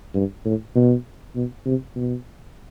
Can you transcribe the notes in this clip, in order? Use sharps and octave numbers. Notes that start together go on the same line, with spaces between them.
G2
A2
B2
B2
C3
B2